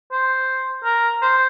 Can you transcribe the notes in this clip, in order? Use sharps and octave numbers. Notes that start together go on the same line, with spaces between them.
C5
A#4
C5